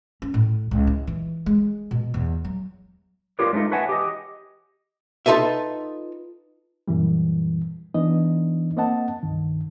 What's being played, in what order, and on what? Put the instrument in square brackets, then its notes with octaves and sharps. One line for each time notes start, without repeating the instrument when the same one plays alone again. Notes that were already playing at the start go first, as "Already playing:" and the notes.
[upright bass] C#4
A2
C#2
E4
E3
G#3
B2
E2
F#3
[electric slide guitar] F4 G4 A#4 B4 C#5 D5
G#3 A3 C#4 D#4 F4
B4 C#5 E5 F#5 G#5 A5
G4 D#5
[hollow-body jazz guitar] D#4 F4 A4 B4 E5
[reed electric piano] F#2 A#2 E3 G3
E3 B3 D4 D#4 D#5
A#3 C4 D#5 F#5 A5
C2 G2 D#3